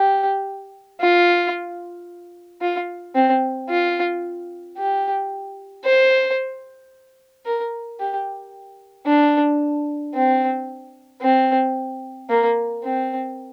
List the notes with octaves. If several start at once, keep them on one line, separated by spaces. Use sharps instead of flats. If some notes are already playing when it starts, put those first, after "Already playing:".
Already playing: G4
F4
F4
C4
F4
G4
C5
A#4
G4
D4
C4
C4
A#3
C4